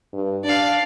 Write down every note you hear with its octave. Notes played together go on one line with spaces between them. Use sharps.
G2
D4 D5 F5